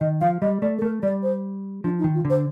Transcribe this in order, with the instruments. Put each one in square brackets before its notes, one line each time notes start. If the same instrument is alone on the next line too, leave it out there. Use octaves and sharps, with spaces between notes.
[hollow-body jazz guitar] D#3 [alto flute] D#5
[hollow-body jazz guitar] F3 [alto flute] F5
[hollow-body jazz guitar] G3 [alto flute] D#5
[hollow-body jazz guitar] A3 [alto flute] D5
[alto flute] A4
[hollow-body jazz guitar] A3 [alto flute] A#4
[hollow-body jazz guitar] G3 [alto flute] D5
[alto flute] C5
[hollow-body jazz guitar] F3 [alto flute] D4
[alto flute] D#4
[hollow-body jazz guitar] D#3
[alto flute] F4
[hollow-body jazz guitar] D3
[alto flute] C5